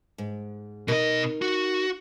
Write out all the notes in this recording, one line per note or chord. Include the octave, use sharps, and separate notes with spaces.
G#2
B2 D#4 A#4 D#5
F#4